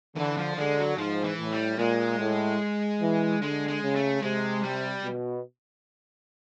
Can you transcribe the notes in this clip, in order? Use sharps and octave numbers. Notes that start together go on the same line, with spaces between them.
D3 E3
F3
D3 G#3
F#3
G#2 F3
E3
A2
G3
A#2 G#3
A2
E3
D3 G#3
G#3
C#3
A3
C3 G#3
G3
B2